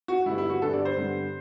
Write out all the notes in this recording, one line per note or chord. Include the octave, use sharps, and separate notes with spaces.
F#4
G2 D3 G3 B3 E4
E4
F#4
G2 D3 G3 B3 A4
D5
C5
G2 D3 G3 B3